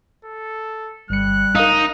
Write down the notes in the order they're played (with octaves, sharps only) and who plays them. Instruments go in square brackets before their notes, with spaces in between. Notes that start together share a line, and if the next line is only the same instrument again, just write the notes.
[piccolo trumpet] A4
[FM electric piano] G1 C#7 [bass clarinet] G3 [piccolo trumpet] F#6
[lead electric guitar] D#4 [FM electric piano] A#4 F5